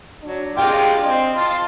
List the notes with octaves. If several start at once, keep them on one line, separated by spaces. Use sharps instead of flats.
F#3 D4
G#3 F4 G4 G5
C4 D#5
F4 A5 C6